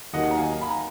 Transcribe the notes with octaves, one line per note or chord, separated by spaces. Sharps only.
D#2 D#3 F#3 A#3 D#5 F#5
A#5
F5 G#5
B5
A#5